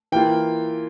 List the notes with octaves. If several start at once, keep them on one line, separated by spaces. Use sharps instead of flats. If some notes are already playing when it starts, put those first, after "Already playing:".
E3 A#3 F4 G5